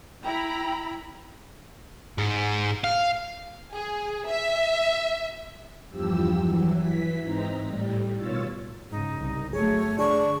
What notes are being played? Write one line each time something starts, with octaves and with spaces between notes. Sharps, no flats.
E4 G5 A#5 B5
G#2
F5
G#4
E5
E2 G2 F3 G4 E6
E3 F#3
E3 B6
G#2 C4 D#4 A#5
A2 G3
B2 D#3 F4 C#5 E6 A6
G#2 C#3 D#4
C2
G1 F#3 A3 G#4 C#5
D3 D4 G#4 C#6